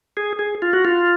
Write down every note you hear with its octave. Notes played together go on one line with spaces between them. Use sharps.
G#4
G#4
F4
F#4
F4